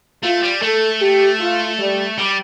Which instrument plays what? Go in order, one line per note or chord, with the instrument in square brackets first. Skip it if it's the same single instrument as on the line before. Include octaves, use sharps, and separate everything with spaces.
[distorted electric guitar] A3 [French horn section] F4
[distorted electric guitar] G3
[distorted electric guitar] A3 [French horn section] A4
[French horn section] G4
F4
G3
[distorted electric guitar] G3